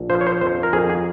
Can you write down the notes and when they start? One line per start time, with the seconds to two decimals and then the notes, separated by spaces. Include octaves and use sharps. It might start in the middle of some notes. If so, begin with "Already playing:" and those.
Already playing: A#1
0.10 F3 C5
0.21 C#5
0.27 C5
0.41 F2 C5
0.63 A#4
0.73 F2 G#4
0.90 G#4